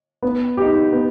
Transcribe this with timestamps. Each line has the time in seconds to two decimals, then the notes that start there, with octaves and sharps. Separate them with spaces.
0.22 B3
0.57 D#4 G4
0.92 B3